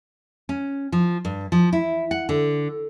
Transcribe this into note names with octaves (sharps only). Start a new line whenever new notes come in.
C#4
F3
G2
F3
E4
F#5
D3